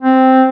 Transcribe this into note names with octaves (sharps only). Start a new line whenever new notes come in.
C4